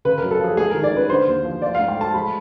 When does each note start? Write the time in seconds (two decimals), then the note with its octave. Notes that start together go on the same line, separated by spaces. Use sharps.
0.05 C#3 B4
0.18 A#4
0.22 F#2
0.31 A4
0.40 F3 G#4
0.57 G#3 G#4
0.71 D#3 A#4
0.83 D5
0.92 C#4 B4
1.09 D3 C5
1.27 D#2
1.44 F3
1.62 F3 D5
1.75 F5
1.79 G#2
1.88 G5
1.97 A3 A5
2.14 G#3 B5